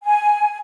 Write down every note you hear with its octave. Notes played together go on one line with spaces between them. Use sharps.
G#5